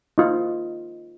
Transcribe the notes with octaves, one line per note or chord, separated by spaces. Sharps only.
D#4 F4